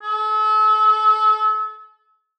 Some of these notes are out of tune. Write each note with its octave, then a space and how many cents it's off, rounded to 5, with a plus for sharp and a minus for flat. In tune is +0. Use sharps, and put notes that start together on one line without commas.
A4 -35